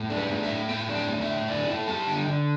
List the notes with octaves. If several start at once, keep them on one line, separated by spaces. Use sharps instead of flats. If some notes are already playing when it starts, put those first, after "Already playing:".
Already playing: A2
D4
B4
A3
E5
A2
A2 G5
D4
G5
A3
E5
A2
D3 D5
E4 A4
G3 A5
D3 G5
D3